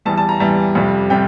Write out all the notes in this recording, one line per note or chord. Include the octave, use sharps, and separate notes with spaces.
E2 E3 G3 A5
A5
A#5
E2 E3 G3 A5
F2 C3 G3
C3 G3 G5